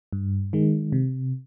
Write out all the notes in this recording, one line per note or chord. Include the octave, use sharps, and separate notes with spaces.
G2
D#3 G#3
C3